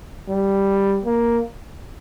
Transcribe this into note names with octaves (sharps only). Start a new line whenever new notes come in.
G3
A#3